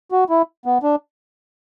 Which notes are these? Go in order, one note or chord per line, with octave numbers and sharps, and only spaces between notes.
F#4
E4
B3
D4